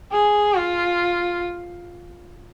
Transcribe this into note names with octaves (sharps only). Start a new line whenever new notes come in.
G#4
F4